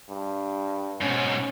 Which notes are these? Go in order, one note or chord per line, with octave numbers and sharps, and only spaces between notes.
G2
G#2 B2 C#4